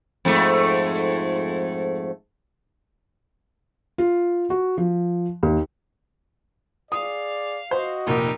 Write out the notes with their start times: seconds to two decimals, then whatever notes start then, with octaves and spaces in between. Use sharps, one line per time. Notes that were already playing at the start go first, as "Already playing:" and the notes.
0.25 F2 G#2 A3
3.98 F4
4.50 F#4
4.78 F3
5.43 D#2
6.92 G#4 D5 F5 D#6
7.71 F#4 C5 D#5
8.07 F1 A#2 D#4 G4